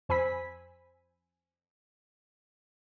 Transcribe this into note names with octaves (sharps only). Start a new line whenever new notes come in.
F2 C5 G#5 B5 E6 B6